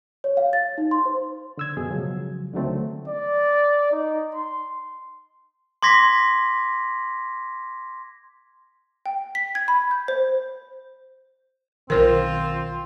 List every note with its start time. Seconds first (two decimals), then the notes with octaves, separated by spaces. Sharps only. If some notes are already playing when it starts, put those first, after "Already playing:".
0.24 C#5
0.37 F5
0.53 A6
0.78 D#4
0.91 C6
1.05 C5
1.57 D3 E6 G#6
1.77 F#2 B2 G#4
1.90 C#3 F3 F#3 G#3
2.53 C#2 D3 D#3 F#3 A3 C4
3.08 D5
3.92 D#4
4.35 C6
5.83 C6 D6 G#6 A#6 B6
9.06 G5
9.35 B6
9.55 G#6
9.68 B5
9.91 G6
10.08 C5
11.90 B1 D#3 C4 F4 A#4 C5